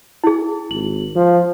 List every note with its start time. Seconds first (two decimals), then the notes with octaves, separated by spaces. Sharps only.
0.24 E4 G#4
0.71 G#1 F#7
1.16 F3